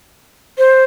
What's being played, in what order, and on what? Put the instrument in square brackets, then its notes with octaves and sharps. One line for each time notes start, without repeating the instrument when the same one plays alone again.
[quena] C5